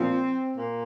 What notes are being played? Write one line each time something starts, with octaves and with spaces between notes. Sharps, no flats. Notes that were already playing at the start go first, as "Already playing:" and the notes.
Already playing: A#2 F3 C4
A#2 A#3